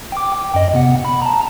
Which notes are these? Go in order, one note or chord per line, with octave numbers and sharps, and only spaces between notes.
G5 D6
G5
F#2 D#5
C3 B3 F#5
B5
A5 A#5